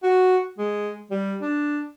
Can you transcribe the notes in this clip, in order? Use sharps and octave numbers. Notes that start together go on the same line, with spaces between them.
F#4
G#3
G3
D4